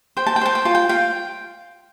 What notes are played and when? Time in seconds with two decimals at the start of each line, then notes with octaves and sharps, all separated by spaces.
0.17 C5 G5
0.26 A5
0.36 G5
0.41 C5 A5
0.55 G5
0.65 F4 A5
0.75 G5
0.89 F4 G5